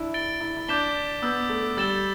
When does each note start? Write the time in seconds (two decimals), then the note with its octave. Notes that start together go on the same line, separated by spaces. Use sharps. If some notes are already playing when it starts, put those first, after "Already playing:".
Already playing: D4 E4
0.14 A6 D7 G7
0.41 E4
0.57 E4
0.68 D4 D6 G6 B6 E7 G7
1.22 B3 E6 G6 B6
1.49 A3
1.77 G3 E6 A6 E7 G7